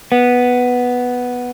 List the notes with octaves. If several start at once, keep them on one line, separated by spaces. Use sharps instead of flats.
B3